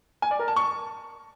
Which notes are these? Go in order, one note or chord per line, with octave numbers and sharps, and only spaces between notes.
G#5
D5
A#4
A5
C#6